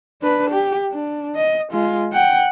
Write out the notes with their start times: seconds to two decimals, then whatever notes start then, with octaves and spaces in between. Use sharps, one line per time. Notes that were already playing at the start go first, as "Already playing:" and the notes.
0.21 D4 B4
0.50 G4
0.92 D4
1.35 D#5
1.72 G#3 F4
2.13 F#5 G5